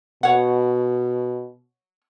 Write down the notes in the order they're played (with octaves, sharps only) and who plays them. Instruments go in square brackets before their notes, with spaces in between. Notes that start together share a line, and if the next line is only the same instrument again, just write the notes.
[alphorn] B2 [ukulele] C#5 F#5